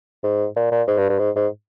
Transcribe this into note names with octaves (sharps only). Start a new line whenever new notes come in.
G#2
A#2
A#2
G#2
G2
G2
G#2
G#2